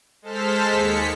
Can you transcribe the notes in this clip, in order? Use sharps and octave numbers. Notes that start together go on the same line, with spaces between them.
G#3 A4 C5 A5 F6 B6
D#2 G#3 B6 C#7